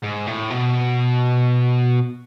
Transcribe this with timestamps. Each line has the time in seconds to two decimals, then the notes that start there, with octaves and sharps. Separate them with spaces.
0.03 G#2
0.26 A2
0.50 B2